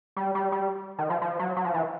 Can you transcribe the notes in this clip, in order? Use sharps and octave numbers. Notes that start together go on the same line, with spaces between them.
G3
G3
G3
D#3
F3
F3
F#3
F#3
F3
E3